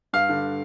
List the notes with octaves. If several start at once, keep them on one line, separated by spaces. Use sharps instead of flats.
G2 F5
D3